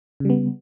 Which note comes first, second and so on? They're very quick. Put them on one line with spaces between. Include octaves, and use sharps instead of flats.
C#3 G3 B3